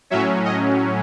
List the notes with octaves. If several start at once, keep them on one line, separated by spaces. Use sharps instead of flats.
A2 F#3 C#4 E5
D#5